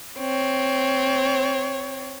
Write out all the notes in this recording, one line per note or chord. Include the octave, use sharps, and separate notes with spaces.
C4 C#5